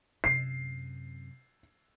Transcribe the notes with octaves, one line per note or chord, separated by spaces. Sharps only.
F#2 C3 C7